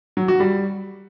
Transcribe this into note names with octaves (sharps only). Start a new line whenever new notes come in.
F#3
F#4
G3